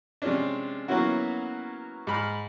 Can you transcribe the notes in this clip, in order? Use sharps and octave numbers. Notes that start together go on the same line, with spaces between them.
C3 F3 G#3 C#4 D4
F#3 A#3 B3 C#4 E4 F#4
G#2 B5 F6